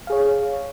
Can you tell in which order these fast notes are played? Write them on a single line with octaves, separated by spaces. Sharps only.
F5 G#4 C#5